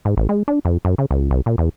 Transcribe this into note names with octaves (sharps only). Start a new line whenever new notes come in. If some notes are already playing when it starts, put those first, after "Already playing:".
G#2
A1
G#3
D4
F2
F#2
C#3
C#2
C2
A#2
E2